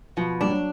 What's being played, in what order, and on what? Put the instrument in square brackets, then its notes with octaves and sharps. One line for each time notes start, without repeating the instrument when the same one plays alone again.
[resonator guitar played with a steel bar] B2 [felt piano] F3
[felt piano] G3 [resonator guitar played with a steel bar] D4
[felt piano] F#3